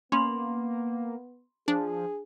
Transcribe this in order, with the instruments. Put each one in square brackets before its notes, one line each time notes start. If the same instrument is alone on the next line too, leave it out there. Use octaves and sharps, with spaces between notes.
[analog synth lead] A#3 [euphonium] B3 [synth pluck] C#4 [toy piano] B5 C6
[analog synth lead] F3 [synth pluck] D4 [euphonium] G#4